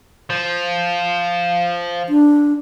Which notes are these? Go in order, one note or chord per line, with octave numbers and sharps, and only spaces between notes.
F3
D4